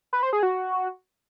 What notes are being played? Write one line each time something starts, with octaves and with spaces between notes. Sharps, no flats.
B4
C5
G#4
F#4